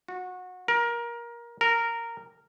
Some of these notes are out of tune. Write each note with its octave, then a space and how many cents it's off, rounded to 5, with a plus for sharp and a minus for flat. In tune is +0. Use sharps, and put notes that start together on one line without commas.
F#4 -20
A#4 +20
A#4 -10